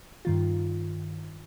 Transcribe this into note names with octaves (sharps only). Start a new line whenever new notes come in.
G2 D#3 F4